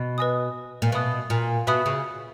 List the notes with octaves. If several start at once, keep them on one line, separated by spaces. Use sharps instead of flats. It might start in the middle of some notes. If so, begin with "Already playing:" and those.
Already playing: B2
B4 D#5 G#5 D#6
A#2
B2 B4 E5 B5 D#6 F#6
A#2
B2 B4 E5 B5 D#6 F#6
C#3